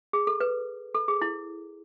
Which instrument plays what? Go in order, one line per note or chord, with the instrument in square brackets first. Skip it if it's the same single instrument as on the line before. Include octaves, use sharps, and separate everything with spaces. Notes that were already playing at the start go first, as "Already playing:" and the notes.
[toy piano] G#4
A4
B4
A4
G#4
E4